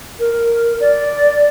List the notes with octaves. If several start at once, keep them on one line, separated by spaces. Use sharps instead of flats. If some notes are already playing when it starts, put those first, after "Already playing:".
A#4
D5